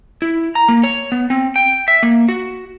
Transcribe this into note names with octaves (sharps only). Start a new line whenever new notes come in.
E4
A#5
A#3
C#5
B3
C4
G5
E5
A#3
F#4